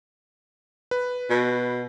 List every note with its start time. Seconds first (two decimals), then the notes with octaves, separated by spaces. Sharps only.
0.91 B4
1.30 B2